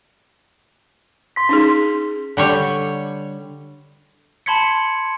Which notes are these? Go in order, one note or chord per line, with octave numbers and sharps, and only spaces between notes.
C6 B6
C#4 D#4 G#4
D3 G3 C#5
A5 B5 C6 G#6 B6 C#7